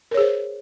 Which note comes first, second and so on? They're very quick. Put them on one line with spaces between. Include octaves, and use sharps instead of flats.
A#4 C#5 G#4 C5